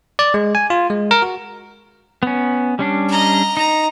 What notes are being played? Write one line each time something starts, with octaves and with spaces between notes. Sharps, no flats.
D5
G#3
G#5
F4
G#3
A#4
F#4
B3 C#4
G3 C#4 D4
D#5 A#5
D#4 A#5